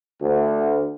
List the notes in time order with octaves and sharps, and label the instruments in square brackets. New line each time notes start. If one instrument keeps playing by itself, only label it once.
[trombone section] D2